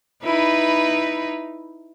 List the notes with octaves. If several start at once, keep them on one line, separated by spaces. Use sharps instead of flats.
D#4 E4 B4